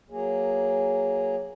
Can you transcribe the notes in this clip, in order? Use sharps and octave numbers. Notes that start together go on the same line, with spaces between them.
F#3 A#3 G#4